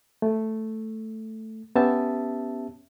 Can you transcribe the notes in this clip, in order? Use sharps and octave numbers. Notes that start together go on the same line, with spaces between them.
A3
B3 C#4 G4 E5 A5